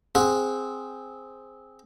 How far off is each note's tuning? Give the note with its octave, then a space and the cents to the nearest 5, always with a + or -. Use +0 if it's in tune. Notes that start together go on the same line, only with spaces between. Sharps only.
C4 +0 G#4 +0 F#5 -15